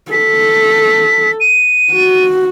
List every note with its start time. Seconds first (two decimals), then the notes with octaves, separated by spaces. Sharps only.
0.12 A4 B6
1.40 D#7
1.93 F#4